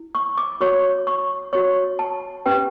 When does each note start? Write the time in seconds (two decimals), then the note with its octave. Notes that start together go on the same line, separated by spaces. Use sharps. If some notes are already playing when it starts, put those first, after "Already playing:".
Already playing: E4
0.15 C#6
0.37 D6
0.61 F#4 C#5 C#6
1.07 C#6
1.53 F#4 C#5 C#6
1.99 A5
2.46 C#4 G4 B4 G5